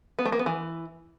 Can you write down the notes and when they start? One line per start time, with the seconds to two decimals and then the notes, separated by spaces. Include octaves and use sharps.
0.19 B3
0.25 A3
0.32 A#3
0.39 B3
0.46 E3